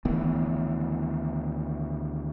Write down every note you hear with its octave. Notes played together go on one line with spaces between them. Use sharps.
D2 D#3 E3 B3